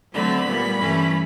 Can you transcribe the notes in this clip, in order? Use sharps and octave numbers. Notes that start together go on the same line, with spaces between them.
D3 F#3 A3 C4 B5
A#2 G3 B3
G2 E3 A3 C#4